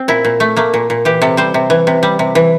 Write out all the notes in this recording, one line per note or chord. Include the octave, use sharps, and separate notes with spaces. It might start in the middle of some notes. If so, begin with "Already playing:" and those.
Already playing: C4
A#2 E4
A#2
A3
A3 A#3
A#2
A#2
E3 G4
C3 A4
G3 C5
C3
E3
C3
G3
C3
E3